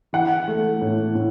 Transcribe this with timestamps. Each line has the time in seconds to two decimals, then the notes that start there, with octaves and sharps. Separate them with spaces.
0.13 E3 F#5
0.48 A3
0.81 A2
1.15 A2